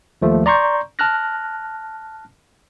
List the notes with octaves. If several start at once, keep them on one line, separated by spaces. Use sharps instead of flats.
D#2 F3 A3
D5 A#5 C6 C#6 G6
A5 F6 F#6 A#6